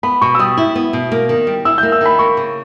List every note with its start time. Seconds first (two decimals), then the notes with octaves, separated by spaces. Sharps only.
0.03 B3 B5
0.22 B2 C#6
0.35 E6
0.39 G3 D#6
0.57 E4
0.75 B3
0.93 B2
1.12 A#3
1.29 D#3
1.47 G3
1.65 E4 E6
1.78 A#3 G6
1.92 E6
2.01 D#3 B5
2.19 A#3 C#6
2.37 C#3